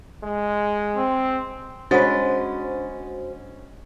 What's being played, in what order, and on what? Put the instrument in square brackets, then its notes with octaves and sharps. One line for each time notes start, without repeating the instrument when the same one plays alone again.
[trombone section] G#3
[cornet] C4
[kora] G#3 B4 [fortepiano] C#4 [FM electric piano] D4 F#4 C5 [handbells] F#5 A6